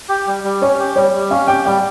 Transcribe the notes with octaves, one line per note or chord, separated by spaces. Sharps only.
G4
G3
G3
C#4 C#5
G4
G3 C#5
G3
C#4 F5
G4 G5
G3 G5